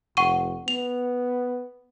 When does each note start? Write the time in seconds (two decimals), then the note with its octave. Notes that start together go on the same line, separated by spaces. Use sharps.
0.17 F1 F#5 C#6 D#7
0.68 B3 F7